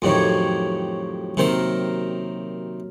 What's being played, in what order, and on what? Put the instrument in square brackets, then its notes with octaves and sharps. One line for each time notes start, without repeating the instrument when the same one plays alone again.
[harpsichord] F2 A2 D#3 [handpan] F#3 G4 C#5
[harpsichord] C3 D#3 C5 [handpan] F#3 A#3 A#4